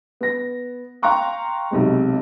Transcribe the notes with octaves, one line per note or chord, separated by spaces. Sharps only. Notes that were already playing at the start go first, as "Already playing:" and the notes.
B3 A#6
F5 G5 A#5 C6 C#6 F#6
B1 C3 G#3